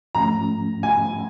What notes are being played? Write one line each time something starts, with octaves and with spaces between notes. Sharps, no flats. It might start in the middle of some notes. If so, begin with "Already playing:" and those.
G#2 F3 A3 C#4 A#5
G#5